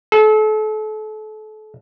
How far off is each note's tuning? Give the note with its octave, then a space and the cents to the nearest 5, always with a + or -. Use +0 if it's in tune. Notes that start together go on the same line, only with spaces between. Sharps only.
A4 -35